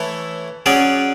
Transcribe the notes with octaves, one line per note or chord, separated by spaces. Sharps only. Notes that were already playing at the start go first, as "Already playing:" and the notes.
Already playing: E3 A3 E4 A4 C#5
F#3 C#4 G#4 D5